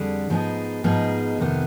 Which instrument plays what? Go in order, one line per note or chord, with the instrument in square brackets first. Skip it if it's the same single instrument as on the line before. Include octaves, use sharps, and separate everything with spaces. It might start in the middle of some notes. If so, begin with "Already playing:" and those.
Already playing: [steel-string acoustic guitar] F2 D3 G3 D4 G#4
G#2 F3 B3 D#4 G#4
G#2 F3 B3 D#4 G#4
F2 C3 D#3 B3